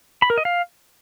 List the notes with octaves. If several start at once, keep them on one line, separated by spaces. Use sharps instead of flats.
B5
A#4
D#5
F5